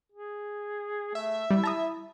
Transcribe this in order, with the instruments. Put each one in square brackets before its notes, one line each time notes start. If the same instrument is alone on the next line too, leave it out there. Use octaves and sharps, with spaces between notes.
[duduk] G#4
[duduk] A3 [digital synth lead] E5
[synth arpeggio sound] G3 [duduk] E4
[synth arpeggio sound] A5 A#5 D#6